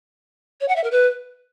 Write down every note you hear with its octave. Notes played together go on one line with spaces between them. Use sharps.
C#5
F#5
E5
A#4
B4